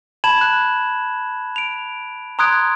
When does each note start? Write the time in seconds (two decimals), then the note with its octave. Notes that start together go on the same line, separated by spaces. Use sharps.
0.24 A5 B5 G#6 E7 F#7
0.41 F#6
1.56 D7 F7
2.39 A#5 C6 D#6 F#6 G#6 D7